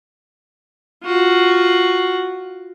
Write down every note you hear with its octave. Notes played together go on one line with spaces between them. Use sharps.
F4 F#4